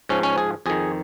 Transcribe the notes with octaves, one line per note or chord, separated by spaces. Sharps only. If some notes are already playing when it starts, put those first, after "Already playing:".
G#2 F3 C#4
C#4
G#4
F2 D#3 G#4